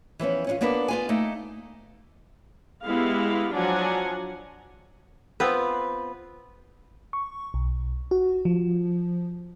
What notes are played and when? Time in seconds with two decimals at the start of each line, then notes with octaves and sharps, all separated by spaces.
0.19 E3 F3 B3 C#4
0.47 C#4 D4 F4
0.61 A#3 B3 D4 A#4 B4
0.88 B3 F4 G#5
1.09 A3 A#3 D#4
2.84 G#3 B3 E4 G4 F5
3.53 F3 F#3 D4 F#5 G#5 A#5
5.40 B3 C4 F4 B4
7.13 C#6
7.54 B1
8.11 F#4
8.45 F3